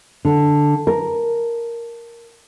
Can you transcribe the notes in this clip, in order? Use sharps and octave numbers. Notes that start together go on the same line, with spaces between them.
D3
A#4